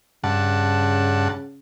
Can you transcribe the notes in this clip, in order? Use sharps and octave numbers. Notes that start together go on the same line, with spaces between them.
G2 C#3 F#5 A5